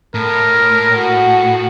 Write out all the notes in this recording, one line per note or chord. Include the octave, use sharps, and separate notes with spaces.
A2 A#4
F#4